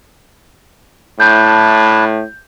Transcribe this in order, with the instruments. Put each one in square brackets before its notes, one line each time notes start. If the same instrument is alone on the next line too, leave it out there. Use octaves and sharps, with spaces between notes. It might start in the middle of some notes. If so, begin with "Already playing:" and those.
[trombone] A2 [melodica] D4 E4 A5 [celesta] G6